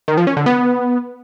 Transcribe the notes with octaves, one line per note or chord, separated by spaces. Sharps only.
D#3
F3
C#4
D3
B3